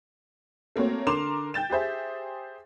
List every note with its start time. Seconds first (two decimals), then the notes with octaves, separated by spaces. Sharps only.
0.76 A3 A#3 C4 F#4 C#5
1.07 D3 A#4 C6 D6 E7 F7
1.54 G5 G6 A6 E7
1.70 G4 G#4 C5 E5